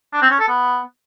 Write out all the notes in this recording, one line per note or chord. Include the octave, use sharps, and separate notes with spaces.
D4
C4
C#4
A4
B3